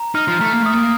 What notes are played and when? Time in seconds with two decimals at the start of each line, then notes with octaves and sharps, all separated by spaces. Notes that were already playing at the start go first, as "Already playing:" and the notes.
Already playing: A#5
0.15 D#4 F6
0.28 F3
0.40 A3 A#5
0.53 A#3
0.62 A3 D#6
0.73 A#3